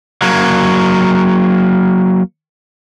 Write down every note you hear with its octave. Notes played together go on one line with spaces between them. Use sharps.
F#3 A#3